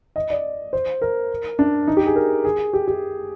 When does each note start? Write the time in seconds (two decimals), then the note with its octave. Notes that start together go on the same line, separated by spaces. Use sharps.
0.16 D#5
0.30 D5
0.73 C5
1.02 A#4
1.59 D4
1.87 D#4
1.97 G4
2.06 G#4
2.16 A#4
2.44 G#4
2.73 G4
2.88 G4